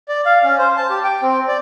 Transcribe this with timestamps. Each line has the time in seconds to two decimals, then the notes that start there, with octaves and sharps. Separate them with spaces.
0.09 D5
0.26 F5
0.43 C#4
0.58 C5
0.77 A5
0.90 G4
1.04 G5
1.22 C4
1.48 D5